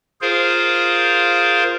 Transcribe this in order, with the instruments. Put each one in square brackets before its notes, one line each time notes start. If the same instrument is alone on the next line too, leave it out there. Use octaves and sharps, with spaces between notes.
[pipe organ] F4 G#4 A#4 C5 F5